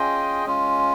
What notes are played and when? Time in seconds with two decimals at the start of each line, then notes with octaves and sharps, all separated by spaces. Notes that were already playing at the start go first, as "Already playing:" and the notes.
Already playing: C#4 F4 G#4 D#5 G5
0.46 G#3 C#4 F4